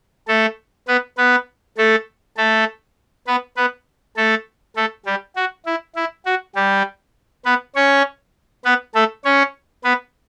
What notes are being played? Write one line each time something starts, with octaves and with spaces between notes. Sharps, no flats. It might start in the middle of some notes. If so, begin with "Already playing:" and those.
A3 A4
B3 B4
B3 B4
A3 A4
A3 A4
B3 B4
B3 B4
A3 A4
A3 A4
G3 G4
F#4
E4
E4
F#4
G3 G4
B3 B4
C#4 C#5
B3 B4
A3 A4
C#4 C#5
B3 B4